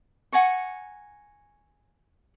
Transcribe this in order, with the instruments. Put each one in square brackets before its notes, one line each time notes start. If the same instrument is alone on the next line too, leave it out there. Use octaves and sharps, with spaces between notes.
[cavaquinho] F#5 G#5 A#5 C#6